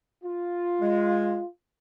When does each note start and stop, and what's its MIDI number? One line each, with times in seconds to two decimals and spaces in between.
0.24 1.46 65
0.80 1.40 56